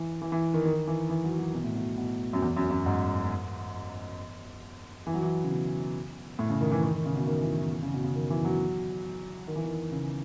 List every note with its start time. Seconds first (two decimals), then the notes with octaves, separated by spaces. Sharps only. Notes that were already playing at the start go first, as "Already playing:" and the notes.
Already playing: E3
0.22 E3
0.32 E3
0.54 D#3
0.65 D#3
0.88 E3
1.09 E3
1.24 F#3
1.38 F#3
1.54 B2
1.64 A2
1.75 B2
1.98 B2
2.33 F#2
2.42 E2
2.57 F#2
2.71 F#2
2.86 G#2
5.07 E3
5.14 F#3
5.23 E3
5.44 C#3
5.50 B2
6.39 A2
6.50 C#3
6.61 D#3
6.72 E3
6.83 D#3
6.94 D#3
7.06 C#3
7.15 B2
7.27 D#3
7.41 E3
7.57 E3
7.71 E3
7.82 C#3
7.93 B2
8.04 C#3
8.15 D#3
8.30 E3
8.45 F#3
9.48 D#3
9.55 E3
9.64 D#3
9.92 C#3